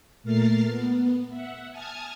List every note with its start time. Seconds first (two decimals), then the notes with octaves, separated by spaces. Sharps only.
0.23 A#2 A3 A#4 F6 A6 C7
0.66 B3
1.29 E5 F#5
1.71 G#5 A5 D#6 F6 G#6